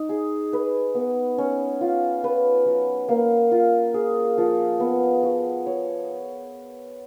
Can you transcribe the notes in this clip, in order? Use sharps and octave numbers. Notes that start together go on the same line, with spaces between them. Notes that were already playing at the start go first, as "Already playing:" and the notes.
Already playing: D#4
G#4
B4
B3
C#4
F4
B4
F#3
A#3
F4
G#4
F3
B3
F#4
C#5